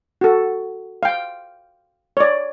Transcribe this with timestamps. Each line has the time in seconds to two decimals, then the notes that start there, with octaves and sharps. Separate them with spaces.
0.21 F#4 A4
1.03 F5 G5
2.17 C#5 D5